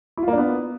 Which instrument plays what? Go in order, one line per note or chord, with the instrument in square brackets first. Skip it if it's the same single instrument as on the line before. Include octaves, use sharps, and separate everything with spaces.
[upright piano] E4
F4
A#3
D4
B3